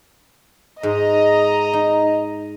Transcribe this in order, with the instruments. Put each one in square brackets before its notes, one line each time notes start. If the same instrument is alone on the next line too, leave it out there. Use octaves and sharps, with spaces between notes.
[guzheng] G#2 [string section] D#5 A#5
[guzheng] D#4